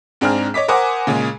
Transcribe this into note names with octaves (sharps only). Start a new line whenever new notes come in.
G#2 C4 D4 G#4 A#5 F6
C#5 D#5 D6 B6
A#4 C5 F#5 G#5 D6 D#6
A#2 C#3 G#3 G#4